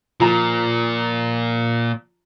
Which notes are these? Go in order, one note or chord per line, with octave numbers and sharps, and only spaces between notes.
A#2 F3 A#5